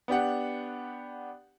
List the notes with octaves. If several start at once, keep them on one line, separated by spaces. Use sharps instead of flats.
B3 D4 G4 F#5